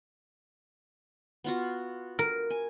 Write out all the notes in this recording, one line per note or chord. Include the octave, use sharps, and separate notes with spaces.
B3 F4 F#4
A#4
G#5